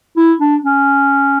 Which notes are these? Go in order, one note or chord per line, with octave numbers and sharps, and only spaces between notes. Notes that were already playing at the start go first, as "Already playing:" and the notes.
E4
D4
C#4